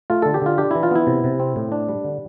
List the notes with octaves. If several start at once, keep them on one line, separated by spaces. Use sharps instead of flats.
A3 F4
D3 A4
G4
D3 F4
D4 G4
E3 E4
F4
B3 E4
C3
C3
C4
A2
D4
G3
D3